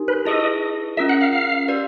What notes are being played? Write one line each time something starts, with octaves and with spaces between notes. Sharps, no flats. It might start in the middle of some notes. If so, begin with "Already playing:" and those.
Already playing: D#4 G4 A#4
B4
E4 G#4 B4 D#5
C#4 F4 A#4 E5
F#5
F5
F5
G4 B4 D5 F5